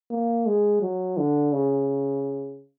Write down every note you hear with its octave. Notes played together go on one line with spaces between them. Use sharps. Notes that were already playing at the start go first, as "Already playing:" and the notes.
A#3
G#3
F#3
D3
C#3